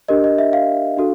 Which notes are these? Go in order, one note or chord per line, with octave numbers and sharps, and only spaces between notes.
D4 G4 A#4 D#5
D#5
E5
F5
D4 F#4 A4